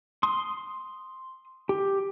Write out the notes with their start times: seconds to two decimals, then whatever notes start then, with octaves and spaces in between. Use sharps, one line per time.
0.23 C6 D#6
1.69 G4